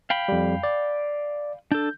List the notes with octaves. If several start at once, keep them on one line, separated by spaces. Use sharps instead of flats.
F5 G5 B5
F2 G3
D5
D4 A4 G6